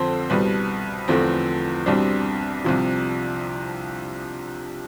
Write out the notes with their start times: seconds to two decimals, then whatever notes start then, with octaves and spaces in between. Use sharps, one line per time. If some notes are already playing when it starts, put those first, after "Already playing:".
Already playing: F2 D3 F3 C4 C5
0.30 C2 B2 G3 B4
1.08 E2 D3 F3 A3 C4
1.86 C2 B2 G3 C4 D4
2.64 C2 C3 F3